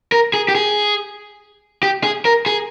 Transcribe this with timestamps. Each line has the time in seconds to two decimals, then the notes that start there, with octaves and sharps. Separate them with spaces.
0.12 A#4
0.34 G#4
0.48 G4
0.55 G#4
1.83 G4
2.04 G#4
2.25 A#4
2.46 G#4